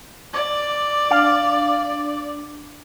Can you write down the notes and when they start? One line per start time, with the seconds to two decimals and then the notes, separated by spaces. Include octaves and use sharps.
0.34 D5 D6
1.11 D4 F5